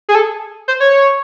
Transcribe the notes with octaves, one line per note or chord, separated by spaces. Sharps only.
G#4
A4
C5
C#5